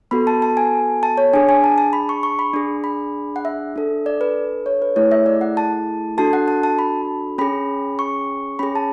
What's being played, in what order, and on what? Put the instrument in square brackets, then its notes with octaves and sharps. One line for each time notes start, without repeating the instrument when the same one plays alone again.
[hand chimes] B3 F#4 A4 B5
A5
A5
G#5
A5
C#5
D4 G#4 G#5
G#5
A5
A5
B5
C#6
C#6
B5
D4 G#4
B5
F#5
E5
D4 A4
D5
B4
C#5
B4
A3 E4 G#4 C#5
E5
D5
F#5
A5
D4 F#4 A4 A5
F#5
A5
A5
B5
C#4 G#4 B5
C#6
C#4 G#4 B5
A5